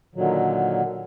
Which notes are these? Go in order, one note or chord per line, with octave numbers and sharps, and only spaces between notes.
A#2 D3 D#3 F#3